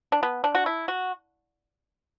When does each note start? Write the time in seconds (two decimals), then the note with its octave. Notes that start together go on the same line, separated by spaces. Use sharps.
0.12 D4
0.23 B3
0.44 D4
0.55 F#4
0.66 E4
0.88 F#4